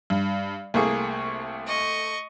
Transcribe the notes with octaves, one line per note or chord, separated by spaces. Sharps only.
G2
C2 A3 A#3 G#4
D#5 C#6